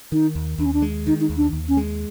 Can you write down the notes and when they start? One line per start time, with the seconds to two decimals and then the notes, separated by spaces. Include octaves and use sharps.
0.12 D#3 D#4
0.35 D#2
0.58 D#2 D4
0.66 C#4
0.73 D4
0.82 G#3
1.07 D#3 D#4
1.21 D#4
1.29 D#2
1.37 D4
1.53 D#2
1.68 C#4
1.77 G#3